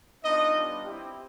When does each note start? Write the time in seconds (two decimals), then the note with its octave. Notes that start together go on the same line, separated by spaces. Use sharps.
0.24 B3 D4 D#4 F4 D#5
0.55 G3 B3 D4 F4
0.85 C4 E4 G4